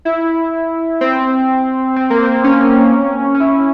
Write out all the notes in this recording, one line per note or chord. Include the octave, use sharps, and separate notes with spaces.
E4
C4
C4
A#3
C4
C#4
C#4
E4